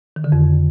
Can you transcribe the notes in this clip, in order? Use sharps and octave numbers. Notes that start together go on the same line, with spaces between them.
D#3
D3
F2